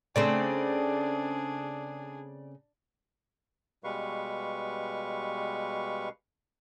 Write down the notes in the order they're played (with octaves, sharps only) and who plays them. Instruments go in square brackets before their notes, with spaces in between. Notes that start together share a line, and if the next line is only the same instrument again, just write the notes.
[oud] C#3 A3 C4 [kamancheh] D4 G#4 [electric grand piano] D5
[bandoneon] B2 G3 G#3 B4 F5 C#6